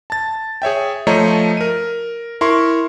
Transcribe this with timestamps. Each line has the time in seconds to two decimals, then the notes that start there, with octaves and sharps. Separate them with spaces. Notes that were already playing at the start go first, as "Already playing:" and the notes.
0.10 A5 A6
0.62 G#4 C#5 E5 G5
1.07 F3 A3 C5 C#5 D#5 A#5
1.57 A#4 D#7
2.41 E4 A#4 C6 C#6